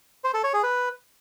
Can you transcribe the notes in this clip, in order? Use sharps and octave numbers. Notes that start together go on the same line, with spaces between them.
C5
A4
C#5
G#4
B4